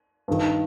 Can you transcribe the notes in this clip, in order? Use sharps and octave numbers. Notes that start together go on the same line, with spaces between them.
G2 D#3